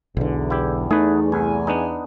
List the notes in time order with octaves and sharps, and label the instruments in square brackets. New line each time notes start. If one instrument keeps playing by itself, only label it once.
[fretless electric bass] B1 D3 [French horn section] E2
[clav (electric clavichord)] E4 G4
[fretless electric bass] A3 [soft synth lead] D#4 [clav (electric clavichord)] G#4 B4
[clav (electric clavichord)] C2 [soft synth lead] G#5
[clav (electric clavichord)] B3 D4 D#4